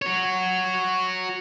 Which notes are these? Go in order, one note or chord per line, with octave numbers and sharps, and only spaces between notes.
F#4 C#5